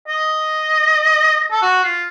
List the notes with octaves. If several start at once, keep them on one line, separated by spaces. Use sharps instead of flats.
D#5
A4
F#4
F4